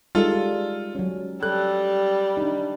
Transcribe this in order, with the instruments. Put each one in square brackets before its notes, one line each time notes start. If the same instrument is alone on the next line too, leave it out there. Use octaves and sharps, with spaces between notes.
[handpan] G3 G#3 D#4 [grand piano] F4 A4
[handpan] F#3 C#4
[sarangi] G3 [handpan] A4 [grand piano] F#6
[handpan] D4 D#4